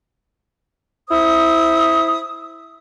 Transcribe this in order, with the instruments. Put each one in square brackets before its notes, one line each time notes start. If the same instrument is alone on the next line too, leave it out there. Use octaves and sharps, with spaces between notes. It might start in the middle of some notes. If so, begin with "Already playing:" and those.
[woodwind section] E4 C5 E5 D#6